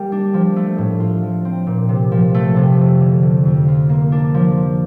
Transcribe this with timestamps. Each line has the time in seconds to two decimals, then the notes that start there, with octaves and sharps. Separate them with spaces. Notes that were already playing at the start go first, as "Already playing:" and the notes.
Already playing: G3 A#3
0.12 D4
0.34 F3
0.56 A3
0.78 A2
1.00 F4
1.23 F3
1.45 C4
1.67 A#2
1.89 C3
2.12 F3
2.34 A3
2.56 C3
2.79 F2
3.01 D3
3.22 F3
3.45 F2
3.68 F4
3.89 A#3
4.12 D4
4.34 F3